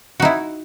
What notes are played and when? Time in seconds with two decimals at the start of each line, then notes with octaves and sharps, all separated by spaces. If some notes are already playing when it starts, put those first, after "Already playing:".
0.20 F#4
0.22 D#4
0.25 E4